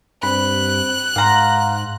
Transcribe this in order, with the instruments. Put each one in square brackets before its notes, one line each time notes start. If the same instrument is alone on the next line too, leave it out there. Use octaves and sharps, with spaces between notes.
[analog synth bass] G2 [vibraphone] C4 C5 [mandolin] B5 [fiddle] F#6
[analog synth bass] G#2 [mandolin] F5 A#5 [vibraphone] F#5 C6 D6